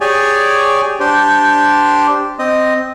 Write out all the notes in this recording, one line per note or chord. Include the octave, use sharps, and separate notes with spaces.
G4 G#4 C#5 D5 G#5
D4 G4 C5
C4 D#5